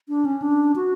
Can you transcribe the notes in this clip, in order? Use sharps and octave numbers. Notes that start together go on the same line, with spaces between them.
D4
C#4
D4
F#4